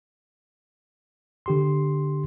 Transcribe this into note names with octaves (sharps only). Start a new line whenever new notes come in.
D3 G4 C6